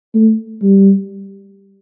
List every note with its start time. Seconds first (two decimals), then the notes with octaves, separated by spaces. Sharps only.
0.15 A3
0.63 G3